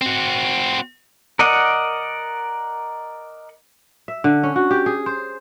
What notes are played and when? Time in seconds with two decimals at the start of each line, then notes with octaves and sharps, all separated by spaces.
0.02 C4 F#4
1.39 A#4 D5 D#5 F#5
4.08 E5
4.24 D3
4.43 C#4
4.56 F#4
4.71 G4
4.86 G#4
5.06 C5